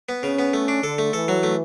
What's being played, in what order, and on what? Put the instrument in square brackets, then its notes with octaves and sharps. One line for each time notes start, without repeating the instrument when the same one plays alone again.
[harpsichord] B3
[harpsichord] C#3 [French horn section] C#4
[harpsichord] B3
A3
D4
[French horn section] D3 [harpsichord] A4
[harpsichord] A3
[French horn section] E3 [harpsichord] A4
[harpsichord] F#3
A3